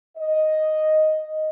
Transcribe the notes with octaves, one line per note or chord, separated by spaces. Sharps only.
D#5